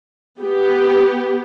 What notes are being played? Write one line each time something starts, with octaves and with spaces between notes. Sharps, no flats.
B3 G4